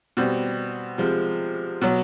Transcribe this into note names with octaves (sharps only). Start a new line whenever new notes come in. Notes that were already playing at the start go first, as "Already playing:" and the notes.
B2 G3 C4
C3 F3 G#3
B2 F#3